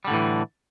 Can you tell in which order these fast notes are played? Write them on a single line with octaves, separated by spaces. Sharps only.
G3 D3 A2 E3